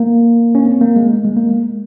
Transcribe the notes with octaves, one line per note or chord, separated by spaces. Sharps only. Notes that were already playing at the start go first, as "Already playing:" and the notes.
Already playing: A#3
C#4
C4
A#3
G#3
A#3
G#3
A#3
G#3